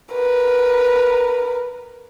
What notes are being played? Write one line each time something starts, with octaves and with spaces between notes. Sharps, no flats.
A#4 B4